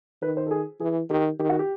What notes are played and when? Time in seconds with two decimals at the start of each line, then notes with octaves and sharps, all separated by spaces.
0.22 D#3 B4
0.37 C5
0.47 A4
0.51 G#4
0.80 E3 G#4
1.10 D#3 G4
1.39 D#3 G4
1.49 F#4
1.59 G4